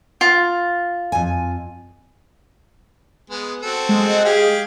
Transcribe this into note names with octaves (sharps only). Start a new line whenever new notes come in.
F4
F2 G#5
G#3 B3
C4 F#4 A4
G#3
G4 G#4 F5